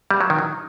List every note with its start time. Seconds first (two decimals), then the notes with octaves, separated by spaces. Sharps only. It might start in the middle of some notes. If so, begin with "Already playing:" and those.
0.11 G3
0.21 F#3
0.30 D#3
0.39 F#3